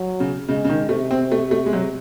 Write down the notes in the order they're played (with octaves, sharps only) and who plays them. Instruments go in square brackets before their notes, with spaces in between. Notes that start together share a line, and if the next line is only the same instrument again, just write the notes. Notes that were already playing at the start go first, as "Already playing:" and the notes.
Already playing: [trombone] F#3
[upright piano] C#3
[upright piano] C#3 [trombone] G#3
[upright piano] C#3
D#3
[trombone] C3 [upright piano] A3
[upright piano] C4
A3
A3
G#3
F#3